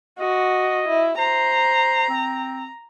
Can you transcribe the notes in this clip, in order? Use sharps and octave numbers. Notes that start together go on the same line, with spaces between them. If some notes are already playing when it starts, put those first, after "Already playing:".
F#4 D#5
E4
C5 A#5
C4